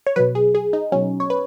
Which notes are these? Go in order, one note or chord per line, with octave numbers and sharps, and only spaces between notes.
C#5
B2 F#3 B4
G#4
G#4
D#4
B2 F#3 C#4
C#5
B4